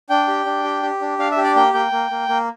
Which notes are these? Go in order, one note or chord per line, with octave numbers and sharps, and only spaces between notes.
D4 G5
G4
D4
G4
G4
D4
D4 F5
E5
G4
D5
A#3 G5
A#3 G5
A#3
A#3
A#3